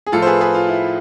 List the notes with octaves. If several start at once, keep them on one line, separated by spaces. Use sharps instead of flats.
G#4
A2 F3 F4 A4
C5
G#4 B4
G#4 B4
F4
E4